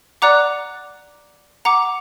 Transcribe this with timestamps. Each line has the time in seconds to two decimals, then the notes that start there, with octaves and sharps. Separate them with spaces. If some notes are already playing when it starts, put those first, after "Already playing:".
0.22 D5 F#5 A#5 D6 F#6
1.65 F#5 A#5 D6